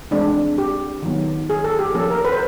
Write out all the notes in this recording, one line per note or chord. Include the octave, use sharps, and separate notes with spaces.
E3 G#3 C4 D4
G4
D#3 F#3 B3
G#4
A4
G4
F3 A#3 C#4 A4
A#4
B4
C5